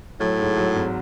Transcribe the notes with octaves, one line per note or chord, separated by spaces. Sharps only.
A2 F#3
G#2
F#3
G#1